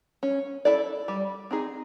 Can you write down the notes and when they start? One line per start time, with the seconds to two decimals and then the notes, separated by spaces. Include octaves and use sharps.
0.23 C#4
0.65 E4 A4 D5
1.08 G3
1.51 C4 D#4 G#4